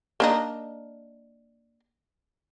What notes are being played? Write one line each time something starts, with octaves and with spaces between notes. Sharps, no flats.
A#3 D4 D#4